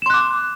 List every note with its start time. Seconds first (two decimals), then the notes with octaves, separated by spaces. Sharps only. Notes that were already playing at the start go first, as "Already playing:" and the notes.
0.02 E7
0.06 C6
0.10 F#6
0.14 D6